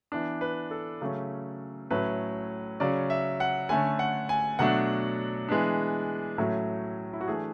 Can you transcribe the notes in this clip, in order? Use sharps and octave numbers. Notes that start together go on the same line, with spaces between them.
E3 B3 D4
B4
A4
C#3 F#3 A3 C#4
A2 F#3 A3 C#4 B4
C#3 F#3 C#4 D5
E5
F#5
D3 A3 C#4 G#5
F#5
G#5
B2 F#3 A3 D4 F#5
E3 G#3 B3 D4
A2 F#3 A3 C#4
E4
F#4
E3 A3 D4 G#4